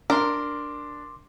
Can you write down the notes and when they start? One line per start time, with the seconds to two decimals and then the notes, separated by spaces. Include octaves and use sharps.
0.10 D4 A#4 C6 D6